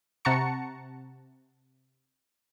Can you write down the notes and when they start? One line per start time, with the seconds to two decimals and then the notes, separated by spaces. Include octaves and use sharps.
0.25 C3 F#5 A5 A#5 C#6 C#7